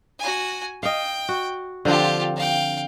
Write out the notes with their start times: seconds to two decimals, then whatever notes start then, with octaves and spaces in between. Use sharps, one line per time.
0.19 F#4 G#5
0.83 D#5 F5 G5
1.29 F#4
1.85 D3 F3 C4 F4 G4
2.36 F5 G5